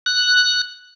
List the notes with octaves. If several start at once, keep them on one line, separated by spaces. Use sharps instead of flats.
F#6